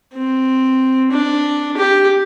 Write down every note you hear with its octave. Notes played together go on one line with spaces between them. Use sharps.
C4
D4
G4